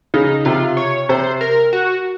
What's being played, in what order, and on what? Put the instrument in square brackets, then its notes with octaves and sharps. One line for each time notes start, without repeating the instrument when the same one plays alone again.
[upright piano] C#3 [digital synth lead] D#4
[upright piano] C3 [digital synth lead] F4
[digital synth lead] C#5
[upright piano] C3 [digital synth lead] C5
[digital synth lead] A#4
F#4